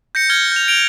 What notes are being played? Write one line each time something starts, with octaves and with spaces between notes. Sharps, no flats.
G6 A#6 C#7
F6 G#6 G7
G6 F7
D7 F7 G7